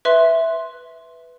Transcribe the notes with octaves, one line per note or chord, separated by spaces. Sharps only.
B4 E5 C6